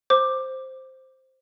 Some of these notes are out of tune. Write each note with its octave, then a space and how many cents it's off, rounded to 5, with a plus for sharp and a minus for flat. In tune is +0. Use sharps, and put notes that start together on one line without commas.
C5 +0 D6 +10